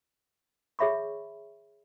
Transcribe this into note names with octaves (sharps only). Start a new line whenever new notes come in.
G#4 C#5 E5 B5 C#6